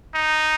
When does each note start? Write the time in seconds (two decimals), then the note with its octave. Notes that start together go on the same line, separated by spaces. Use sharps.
0.15 D#4